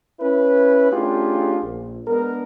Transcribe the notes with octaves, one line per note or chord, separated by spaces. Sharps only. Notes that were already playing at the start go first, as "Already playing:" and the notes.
C#4 E4 B4
A3 C#4 D4 F4 G4 G#4
A#1
G#3 B3 D4 A#4